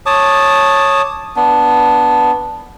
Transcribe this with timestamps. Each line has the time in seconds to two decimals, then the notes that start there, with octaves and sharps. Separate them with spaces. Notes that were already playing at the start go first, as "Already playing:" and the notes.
0.06 C#5 A5 D6 D#6
1.36 B3 D4